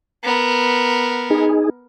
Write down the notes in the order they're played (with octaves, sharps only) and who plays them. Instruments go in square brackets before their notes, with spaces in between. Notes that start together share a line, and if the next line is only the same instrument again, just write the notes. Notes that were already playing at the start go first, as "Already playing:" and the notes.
[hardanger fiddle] B3 A#4
[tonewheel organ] D#4 G#4